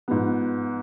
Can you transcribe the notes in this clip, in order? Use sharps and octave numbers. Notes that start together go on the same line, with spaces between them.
G#2 F3 B3